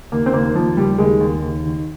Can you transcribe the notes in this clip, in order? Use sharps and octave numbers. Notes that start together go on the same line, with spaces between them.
D#2 A#3
C4
D#2 A#3
D#2 F3
D#2 G3
D#2 G#3
D#2
D#2
D#3